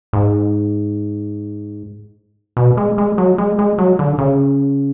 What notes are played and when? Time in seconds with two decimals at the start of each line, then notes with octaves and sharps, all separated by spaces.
0.13 G#2
2.57 B2
2.77 G#3
2.98 G#3
3.18 F#3
3.38 G#3
3.59 G#3
3.78 F#3
3.99 D3
4.18 C#3